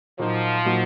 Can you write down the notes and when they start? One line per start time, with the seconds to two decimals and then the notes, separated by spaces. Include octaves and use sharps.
0.18 A#2 F3 F#3 A#3 D#4 F#4
0.65 A#2 F#3 A#3 D#4 F#4